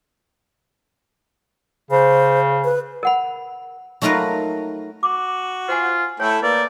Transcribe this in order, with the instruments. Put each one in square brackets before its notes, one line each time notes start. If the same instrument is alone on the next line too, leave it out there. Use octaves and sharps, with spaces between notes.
[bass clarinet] C#3 [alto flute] C5
[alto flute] B4
[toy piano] A#4 F#5 B5
[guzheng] F#3 A3 D#4 F4 A#4 B4
[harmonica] F#4 [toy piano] D6
[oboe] F4 [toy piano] C5 F#5 G#5
[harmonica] A3 E4 A4 [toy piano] C#5 [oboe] G5
[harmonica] A#3 [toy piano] B4 [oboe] D5